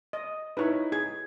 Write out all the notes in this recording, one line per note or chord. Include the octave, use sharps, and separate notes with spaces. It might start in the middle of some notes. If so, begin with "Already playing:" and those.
D#5
D#4 E4 B4 C#5 B5
G#4 G#6